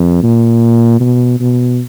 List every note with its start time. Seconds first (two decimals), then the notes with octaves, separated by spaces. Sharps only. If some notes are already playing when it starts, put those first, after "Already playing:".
Already playing: F2
0.23 A#2
1.00 B2
1.40 B2